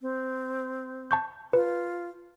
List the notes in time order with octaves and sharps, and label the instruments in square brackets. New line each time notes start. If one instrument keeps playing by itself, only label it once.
[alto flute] C4
[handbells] A5 C#6 G6
[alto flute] F4 [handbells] B4